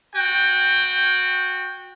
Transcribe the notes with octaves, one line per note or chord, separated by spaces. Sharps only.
F#4 G5